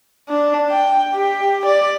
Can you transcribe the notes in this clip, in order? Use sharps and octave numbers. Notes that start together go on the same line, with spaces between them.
D4
G5
G4
D5